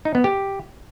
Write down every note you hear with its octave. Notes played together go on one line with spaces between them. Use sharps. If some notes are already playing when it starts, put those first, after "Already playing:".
D#4
B3
G4